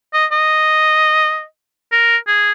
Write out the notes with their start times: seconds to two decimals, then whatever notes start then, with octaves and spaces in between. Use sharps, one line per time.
0.14 D#5
0.32 D#5
1.92 A#4
2.27 G#4